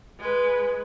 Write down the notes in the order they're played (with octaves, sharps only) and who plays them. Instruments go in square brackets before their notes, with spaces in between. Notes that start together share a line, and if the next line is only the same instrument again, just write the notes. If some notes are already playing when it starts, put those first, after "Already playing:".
[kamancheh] G#3 B4